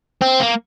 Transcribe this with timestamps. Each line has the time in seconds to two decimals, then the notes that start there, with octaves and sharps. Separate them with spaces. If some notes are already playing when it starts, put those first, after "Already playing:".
0.21 C4
0.40 A#3